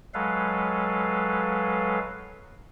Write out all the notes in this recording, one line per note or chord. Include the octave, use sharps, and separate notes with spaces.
F#3 G#3 A4 B4 F5